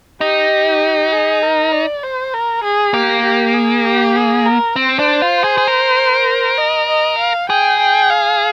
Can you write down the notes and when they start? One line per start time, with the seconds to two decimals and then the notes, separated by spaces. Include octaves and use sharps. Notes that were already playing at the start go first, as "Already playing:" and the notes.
0.21 D#4 G4
1.13 G#4
1.43 A#4
1.73 D5
2.03 C5
2.34 A#4
2.64 G#4
2.94 A#3 G4
3.24 G4
3.54 G#4
3.85 G4
4.16 G#4
4.46 A#4
4.76 C4 C5
4.99 D4
5.22 F4
5.44 G#4
5.58 G#4
5.68 A#4
6.58 D#5
6.89 D#5
7.18 F5
7.50 G#4 G5
7.80 G5
8.10 F5